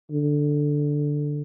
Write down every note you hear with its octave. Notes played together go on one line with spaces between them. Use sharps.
D3